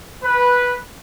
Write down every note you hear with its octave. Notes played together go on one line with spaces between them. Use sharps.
B4